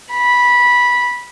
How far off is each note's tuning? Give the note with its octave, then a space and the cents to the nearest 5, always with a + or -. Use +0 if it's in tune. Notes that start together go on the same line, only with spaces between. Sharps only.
B5 -15